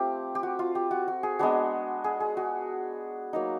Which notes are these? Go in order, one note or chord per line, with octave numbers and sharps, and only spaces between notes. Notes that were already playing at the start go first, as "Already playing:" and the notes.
Already playing: A3 C4 F4 G4
G4
F#4
F4
G4
F#4
F#4
G#4
G#3 B3 D4 F#4
G#4
G#4
F#4
F#3 A#3 D#4